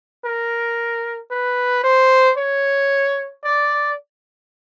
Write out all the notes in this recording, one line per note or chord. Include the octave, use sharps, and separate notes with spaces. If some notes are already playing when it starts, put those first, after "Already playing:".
A#4
B4
C5
C#5
D5